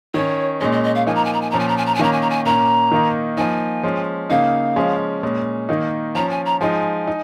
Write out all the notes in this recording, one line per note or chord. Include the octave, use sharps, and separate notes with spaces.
D#3 C#4 C#5
A#2 G#3 C#4 D#5
D#5
D#5
F5
F3 A#3 D#4 G#5
A#5
G#5
A#5
G#5
A#2 F3 C#4 A#5
G#5
A#5
G#5
A#5
G#5
D#3 A#3 C#4 A#5
G#5
A#5
G#5
A#2 A#3 C#4 A#5
D#3 A#3 D#4
F3 A#3 D#4 G#5
F3 G#3 C#4
C#3 A#3 D#4 F5
F3 G#3 C#4
A#2 G#3 C#4
D#3 A#3 D#4
F3 C#4 A#5
G#5
A#5
F3 G#3 D#4 G#5
D#4